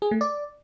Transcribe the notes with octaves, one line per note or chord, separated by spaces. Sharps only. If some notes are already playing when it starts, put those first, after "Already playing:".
G#4
A3
D5